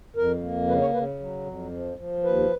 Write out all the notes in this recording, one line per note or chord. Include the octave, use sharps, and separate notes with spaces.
F2 A#4
A#3
C#3 B4
C#5
C#3 B4
F#3
F2
F3
F3
D#2 B4